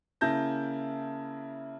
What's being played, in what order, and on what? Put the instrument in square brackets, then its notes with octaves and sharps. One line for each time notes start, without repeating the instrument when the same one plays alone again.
[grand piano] C#3 A#3 E4 A5 G6 A#6